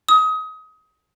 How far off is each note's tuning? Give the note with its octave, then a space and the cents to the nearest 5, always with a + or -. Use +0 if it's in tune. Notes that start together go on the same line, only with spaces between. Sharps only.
D#6 +25